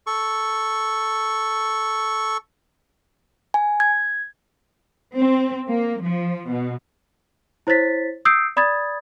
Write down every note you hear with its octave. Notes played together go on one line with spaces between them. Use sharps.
A4 C#6
G#5
G#6
C4
A#3
F3
B2
E4 C5 C#5 A6 B6
D#6 E6 G6 C7 D7
D5 B5 D#6 G#6 A6